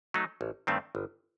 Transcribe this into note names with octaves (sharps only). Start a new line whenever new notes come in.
F#3 A3 D#4
A1
G2 D#3 A3 C4
G1